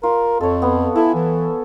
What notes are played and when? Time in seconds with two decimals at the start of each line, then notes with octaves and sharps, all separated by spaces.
0.03 F4 A#4
0.41 F2 A4 C#5
0.62 B3
0.96 E4 A4 E5 G#5
1.15 E3